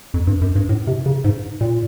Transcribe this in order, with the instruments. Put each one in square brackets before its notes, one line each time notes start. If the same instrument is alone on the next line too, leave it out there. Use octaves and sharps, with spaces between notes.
[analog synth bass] F2
G2
F#2
G2
A2
C3
C#3
G#2
A#2